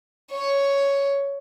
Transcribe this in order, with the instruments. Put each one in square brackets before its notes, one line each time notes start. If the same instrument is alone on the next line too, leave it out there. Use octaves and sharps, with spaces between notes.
[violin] C#5